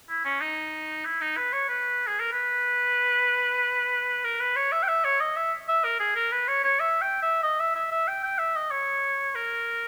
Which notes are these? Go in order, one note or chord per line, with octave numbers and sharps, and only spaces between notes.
E4
C#4
D#4
E4
D#4
B4
C#5
B4
G#4
A#4
B4
A#4
B4
C#5
E5
G5
E5
C#5
D#5
E5
E5
A#4
G#4
A#4
B4
C#5
C#5
E5
G5
E5
D#5
E5
E5
E5
G5
G5
E5
D#5
C#5
A#4